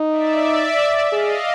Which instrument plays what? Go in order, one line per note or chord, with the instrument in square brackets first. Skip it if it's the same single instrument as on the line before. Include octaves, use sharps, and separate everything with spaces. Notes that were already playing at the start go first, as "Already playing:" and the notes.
Already playing: [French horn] D#4
[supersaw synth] D5 E5
[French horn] G#4 [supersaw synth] D#5 F5